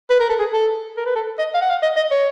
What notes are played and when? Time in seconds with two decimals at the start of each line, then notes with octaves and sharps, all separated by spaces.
0.10 B4
0.20 A#4
0.29 A4
0.39 G#4
0.53 A4
0.97 A#4
1.06 B4
1.16 A4
1.39 D#5
1.54 F5
1.62 F#5
1.70 F5
1.83 D#5
1.97 D#5
2.11 C#5